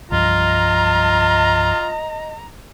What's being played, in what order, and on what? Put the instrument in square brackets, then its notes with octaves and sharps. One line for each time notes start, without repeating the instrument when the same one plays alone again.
[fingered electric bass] C2 G2 F3 [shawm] F4 [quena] D#5 [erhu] A#5